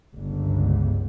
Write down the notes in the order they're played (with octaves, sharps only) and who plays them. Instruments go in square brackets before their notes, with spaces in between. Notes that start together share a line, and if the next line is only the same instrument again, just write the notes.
[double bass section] G1 C#2